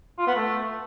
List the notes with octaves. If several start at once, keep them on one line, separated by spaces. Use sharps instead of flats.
F4
B3
A3